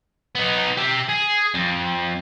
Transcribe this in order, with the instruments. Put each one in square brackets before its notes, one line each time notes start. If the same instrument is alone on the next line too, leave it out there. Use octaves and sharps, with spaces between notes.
[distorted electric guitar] B3 D#4
G4 E5
G#4
F2